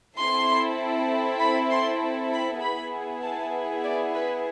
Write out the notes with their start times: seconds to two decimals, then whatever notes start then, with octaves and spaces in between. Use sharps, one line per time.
0.17 C4 E4 A4 C6
1.39 B5
1.71 C6
2.31 B5
2.61 B3 E4 G#4 B5
3.22 A5
3.84 D5
4.14 B4